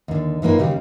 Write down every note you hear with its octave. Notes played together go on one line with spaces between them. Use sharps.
D#2 D3
F#2 E3 A#3 D#4 F4
D#2 C#3 G3 G4